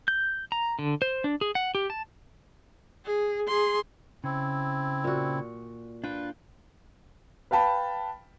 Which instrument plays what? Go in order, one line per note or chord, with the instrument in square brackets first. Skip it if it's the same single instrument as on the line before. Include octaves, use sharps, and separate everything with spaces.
[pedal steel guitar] G6
A#5
D3
C5
D4
G#4
F#5
G4
A5
[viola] G#4
G#4 C6
[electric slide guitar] C#3 [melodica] C4 E4
[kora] A#2 F#4
[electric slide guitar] D4 F4 [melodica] B4 [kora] G5
[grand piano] B4 F5 G5 A5 B5